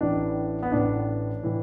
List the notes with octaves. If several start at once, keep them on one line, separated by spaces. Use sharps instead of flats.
A1 A2 E3 D4
B3
A1 A2 E3 D4
A2 E3